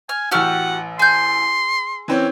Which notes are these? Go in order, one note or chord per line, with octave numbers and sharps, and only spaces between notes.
G#5 F6
A1 F#4 G4 F#5 E6 F6
G#4 C6 G6
E3 C4 C#4